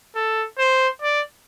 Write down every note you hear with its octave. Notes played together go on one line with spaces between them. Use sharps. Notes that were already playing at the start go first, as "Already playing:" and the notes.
A4
C5
D5